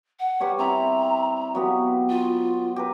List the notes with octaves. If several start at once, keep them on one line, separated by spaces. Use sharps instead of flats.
F#5
G3 B4 C#5
C4 E4 A#5 B5
F#3 B3 G4
F4
G4 A#4 B4